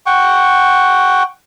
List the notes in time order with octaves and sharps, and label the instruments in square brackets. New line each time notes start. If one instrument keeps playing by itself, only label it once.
[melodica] F#5 G5 C#6